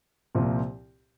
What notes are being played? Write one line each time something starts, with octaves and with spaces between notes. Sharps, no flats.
C2 A#2 F3 C4